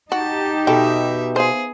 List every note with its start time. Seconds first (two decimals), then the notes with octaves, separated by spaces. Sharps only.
0.12 D#4 F#4 G4 A5
0.67 B2 A4 E5 G5
1.36 G#4 C5 F5